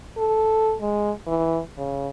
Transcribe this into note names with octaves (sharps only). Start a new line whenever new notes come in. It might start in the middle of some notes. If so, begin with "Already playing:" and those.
A4
G#3
E3
C#3